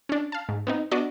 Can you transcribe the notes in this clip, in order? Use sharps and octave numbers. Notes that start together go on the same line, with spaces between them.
C#4 D4
F5 A5
G#2
B3 C4 D#4
B3 D4 F#4 D5 D#5